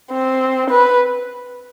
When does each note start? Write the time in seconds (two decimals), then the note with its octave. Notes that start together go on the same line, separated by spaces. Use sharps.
0.12 C4
0.70 B4